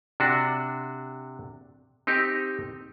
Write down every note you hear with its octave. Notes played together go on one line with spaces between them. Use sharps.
C3 D4 F#4
C4 D#4 G4